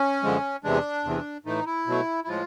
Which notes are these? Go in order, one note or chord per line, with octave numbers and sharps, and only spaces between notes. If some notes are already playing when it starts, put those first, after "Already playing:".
Already playing: C#4
F#2 D3 F3 G#3
E2 C3 E3 G#3 D4
E2 C3 E3
A2 E3 A3 D#4
E4
B2 F#3 A3
E4
A2 F3 G#3 F4